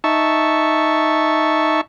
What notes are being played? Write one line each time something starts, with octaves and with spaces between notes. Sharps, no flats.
D#4 E5 A5 C#6